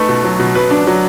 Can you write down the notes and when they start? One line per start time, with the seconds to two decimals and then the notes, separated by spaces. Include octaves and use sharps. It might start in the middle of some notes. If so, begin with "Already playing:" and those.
Already playing: A3 D#4 B4
0.09 B2
0.24 F#3
0.40 B2
0.55 F#3 B4
0.71 D4
0.87 F#3